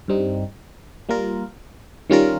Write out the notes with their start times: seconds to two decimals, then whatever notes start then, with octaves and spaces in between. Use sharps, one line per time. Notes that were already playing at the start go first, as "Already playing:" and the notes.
0.08 G2 G3 C4 D#4
1.09 G3 A#3 F4 A#4
2.10 D#3 G3 C#4 F4 A#4